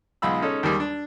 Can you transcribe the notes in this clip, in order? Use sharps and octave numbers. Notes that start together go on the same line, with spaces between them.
B1 G#3 F4 B5 E6
G#3 C#4 D#4 A4
D#2 D#3 G3 G#3
D4